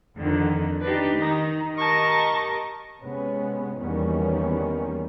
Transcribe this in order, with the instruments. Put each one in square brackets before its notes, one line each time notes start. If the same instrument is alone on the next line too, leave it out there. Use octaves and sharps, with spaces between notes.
[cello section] F2 D3 D#3
[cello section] D4 D#4 G4 [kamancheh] B4
[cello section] D#3 [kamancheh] D#4
[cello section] G4 A#4 D#5 [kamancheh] A5 C#6
[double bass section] C3 G#3 B3 C#4
E2 D#3 G3 A#3 B3 C#4